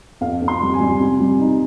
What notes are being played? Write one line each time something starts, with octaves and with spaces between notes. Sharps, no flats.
F2 F5
F2
C6
G3
G#5
G3
C3
G3
D#4